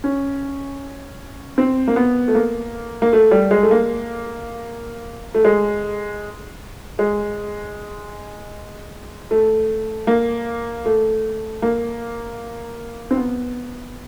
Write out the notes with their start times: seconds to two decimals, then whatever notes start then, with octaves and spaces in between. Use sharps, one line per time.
0.04 C#4
1.58 C4
1.88 A#3
1.96 B3
2.28 A3
2.35 A#3
3.02 A#3
3.13 A3
3.31 G3
3.51 G#3
3.63 A3
3.71 A#3
5.34 A3
5.45 G#3
6.99 G#3
9.31 A3
10.07 A#3
10.85 A3
11.62 A#3
13.11 C4
13.17 B3